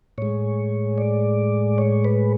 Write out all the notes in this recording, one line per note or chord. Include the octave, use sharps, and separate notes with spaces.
A2 G#3 C#5
D5
C#5
B4